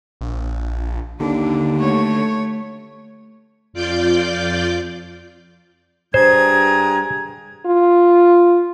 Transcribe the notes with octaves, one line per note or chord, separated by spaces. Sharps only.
A#1
D#2 D3 D4
A3 C#5
F2 F4 D5 D6 G6
G2 G#4 C5 A#5 G#6
F4